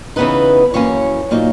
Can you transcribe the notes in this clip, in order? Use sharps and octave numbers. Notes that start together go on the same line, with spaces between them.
C#3 E3 B3 D#4 B4
F#2 E3 A#3 C#4 C#5
A#2 F#3 A#3 D#4